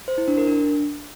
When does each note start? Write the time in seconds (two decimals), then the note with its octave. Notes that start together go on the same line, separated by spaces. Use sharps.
0.08 C5
0.18 E4
0.28 D4
0.38 A#4
0.47 D4